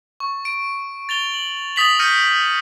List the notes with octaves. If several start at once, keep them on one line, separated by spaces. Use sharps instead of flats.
C#6
D7
A6 F7 G7
F#7
D#6 A6 B6 F7 F#7
D#6 F6 G6 A#6 C#7 D#7